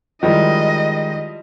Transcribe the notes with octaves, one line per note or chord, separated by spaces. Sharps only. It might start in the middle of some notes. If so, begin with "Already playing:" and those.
D#3 F3 G3 G#3 E4 D#5